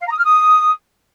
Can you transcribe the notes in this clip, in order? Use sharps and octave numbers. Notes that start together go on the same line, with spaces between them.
F5
A#5
D#6
F6
D#6